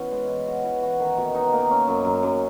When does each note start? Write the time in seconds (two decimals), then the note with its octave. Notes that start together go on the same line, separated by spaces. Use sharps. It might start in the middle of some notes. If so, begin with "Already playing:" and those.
Already playing: B2 E3 C#4
0.12 G#3
0.29 E3
0.47 F#4
0.64 E3
0.82 F#4
1.00 D#3
1.18 B2
1.35 D#4
1.53 A#3
1.71 C#4
1.88 F#2
2.05 F#2
2.23 F#2